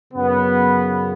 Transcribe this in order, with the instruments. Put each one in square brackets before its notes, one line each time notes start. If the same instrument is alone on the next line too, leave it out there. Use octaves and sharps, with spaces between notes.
[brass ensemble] F#2 C#3 F#3 B3